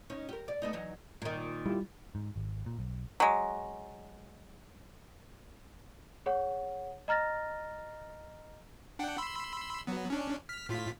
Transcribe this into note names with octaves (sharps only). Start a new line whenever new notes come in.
C#4 D#4
G4 A#4
D5
A3 B3 D#4
E3 F#3 D#4
A#2 D#3
G3 E4 F4 G4
G#2
G#1
A#2
B1
F#3 G#3
G#4 C#5 F#5
D#5 A#5 F6 A6 A#6
D4 F#5 G5
B5 C6 E6
F#3 B3
C#4 D4
F6 B6
A2 F4 B6